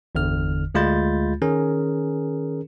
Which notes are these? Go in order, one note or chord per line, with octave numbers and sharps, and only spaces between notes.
G1 E2 D3 F6
D2 G#3 F4 B5 G6 A6
D#3 C#4 G#4 A#4